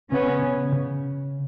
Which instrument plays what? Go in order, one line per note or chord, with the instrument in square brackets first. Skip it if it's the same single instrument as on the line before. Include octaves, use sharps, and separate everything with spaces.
[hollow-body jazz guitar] C#3 [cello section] B3 C#4
[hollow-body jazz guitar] C#3
C#3